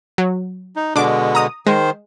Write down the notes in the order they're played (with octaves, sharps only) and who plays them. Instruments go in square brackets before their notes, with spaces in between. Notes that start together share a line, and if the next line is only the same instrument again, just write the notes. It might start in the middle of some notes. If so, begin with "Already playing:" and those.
[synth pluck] F#3
[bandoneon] D#4
[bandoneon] B2 D3 G#3 [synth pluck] D4 D6
[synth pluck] A#5 D#6
[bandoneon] D#3 C5 [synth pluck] G#3